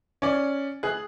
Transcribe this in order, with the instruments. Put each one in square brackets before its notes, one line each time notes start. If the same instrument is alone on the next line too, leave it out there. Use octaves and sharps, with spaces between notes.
[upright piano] C#4 D5
G#4 F#6